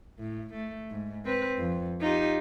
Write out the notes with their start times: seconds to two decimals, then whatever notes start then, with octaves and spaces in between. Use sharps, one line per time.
0.19 A2
0.54 A3
0.90 G#2
1.25 C4 B4
1.58 F2
2.02 D#4 F4 G4